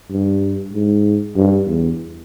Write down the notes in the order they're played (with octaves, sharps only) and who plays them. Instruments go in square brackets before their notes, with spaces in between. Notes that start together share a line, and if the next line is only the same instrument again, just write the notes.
[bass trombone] G2
G#2
G2
E2